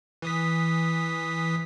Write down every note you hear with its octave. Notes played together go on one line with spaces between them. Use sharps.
E3 D#6 B6